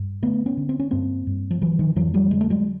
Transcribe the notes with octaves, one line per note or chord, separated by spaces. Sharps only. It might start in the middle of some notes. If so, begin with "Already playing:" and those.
Already playing: G2
D3 A3 B3
B3 C#4
D3
C4
C#4
G2 A#3 C4
G2
F3
D3 E3 F#3
D#3 F3
F2 E3 F#3
F3 G3
D3 G#3
A3
F#3 G#3